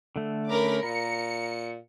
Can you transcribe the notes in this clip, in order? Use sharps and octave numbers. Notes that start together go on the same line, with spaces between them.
D3 A3
C#4 A#4 B5 D6
A#2 A#5 C#7